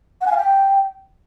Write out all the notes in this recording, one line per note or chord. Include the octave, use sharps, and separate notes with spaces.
F#5
G#5
F5
G5